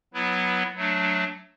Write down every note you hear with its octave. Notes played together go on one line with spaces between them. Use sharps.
F#3 B3 E4 B4
F#3 A3 D4